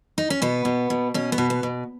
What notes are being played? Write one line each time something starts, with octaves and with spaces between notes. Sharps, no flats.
D#4
C#4
B2 B3
B2
B2
B2 C#4
B3
B2
B3
B2